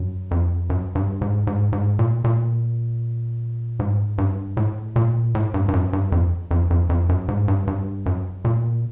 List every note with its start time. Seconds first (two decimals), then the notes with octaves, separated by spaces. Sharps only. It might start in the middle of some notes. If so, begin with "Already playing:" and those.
Already playing: F#2
0.31 F2
0.70 F#2
0.95 G2
1.21 G#2
1.47 G#2
1.73 G#2
1.99 A#2
2.24 A#2
3.79 G#2
4.18 G2
4.57 A2
4.96 A#2
5.35 A2
5.54 G2
5.68 G2
5.73 F#2
5.93 G2
6.12 F2
6.51 F2
6.70 F2
6.89 F2
7.09 F#2
7.28 G#2
7.48 G2
7.67 G2
8.06 F#2
8.45 A#2